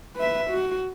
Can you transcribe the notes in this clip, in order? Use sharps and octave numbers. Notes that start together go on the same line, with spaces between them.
B4 E5
F#4